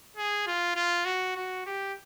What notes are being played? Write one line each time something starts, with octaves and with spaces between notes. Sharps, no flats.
G#4
F4
F4
F#4
F#4
G4